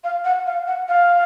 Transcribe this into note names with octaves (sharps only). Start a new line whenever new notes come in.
F5
F#5
F5
F#5
F5